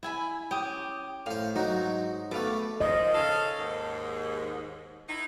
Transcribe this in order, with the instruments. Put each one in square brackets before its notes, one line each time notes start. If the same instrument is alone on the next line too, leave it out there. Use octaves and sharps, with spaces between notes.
[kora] E4 [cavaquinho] E5 G#5 B5
[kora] C#4 [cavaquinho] G4 D#6
[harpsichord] A2 C5 [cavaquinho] F5
[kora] G#2 F#4 [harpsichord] F#3 D#4
[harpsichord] B2 A3 [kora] A4 B4 [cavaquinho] F5 D6
[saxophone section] G#2 D#3 F3 [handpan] D#5
[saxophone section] C#3 A4 F5
D#2 G#2
D#4 E4